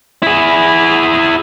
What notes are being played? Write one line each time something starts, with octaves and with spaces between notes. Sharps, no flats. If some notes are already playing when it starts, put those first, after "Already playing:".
E4 G#4